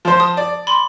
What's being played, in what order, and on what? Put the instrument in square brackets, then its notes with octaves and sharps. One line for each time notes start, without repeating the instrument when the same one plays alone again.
[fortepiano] F3 C5
[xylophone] A5 D#6
[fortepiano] D5
[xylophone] B5 C6